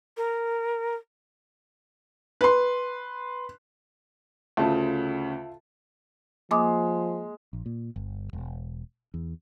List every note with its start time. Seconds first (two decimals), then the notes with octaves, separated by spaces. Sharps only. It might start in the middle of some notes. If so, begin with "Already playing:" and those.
0.17 A#4
2.41 B4 C6
4.57 D2 C#3 F4 E5 A5
6.51 F3 G#3 A#3 D6 D#6
7.53 A#1
7.66 A#2
7.96 G1
8.33 E1
9.14 E2